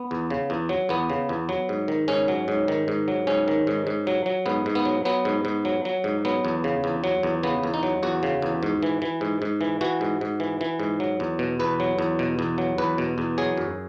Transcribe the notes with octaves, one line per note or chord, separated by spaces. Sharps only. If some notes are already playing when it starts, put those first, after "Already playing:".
Already playing: B3
E2
C#3
E2
F#3
E2 B3
C#3
E2
F#3
G#2
D#3
G#2 C#4
F#3
G#2
D#3
G#2
F#3
G#2 C#4
D#3
G#2
G#2
F#3
F#3
G#2 B3
G#2
B3
F#3
F#3 B3
G#2
G#2
F#3
F#3
G#2
F#3 B3
E2
C#3
E2
F#3
E2
C#3 B3
E2
D#4
F#3
E2 F#4
C#3
E2
G#2
E3
E3
G#2
G#2
E3
E3 F#4
G#2
G#2
E3
E3
G#2
F#3
E2
B2
E2 B4
F#3
E2
B2
E2
F#3
E2 B4
B2
E2
F#3 G#4
F#2